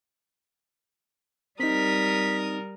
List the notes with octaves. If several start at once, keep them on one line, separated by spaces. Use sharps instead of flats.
G3 C4 D#4 A#4 D#6 B6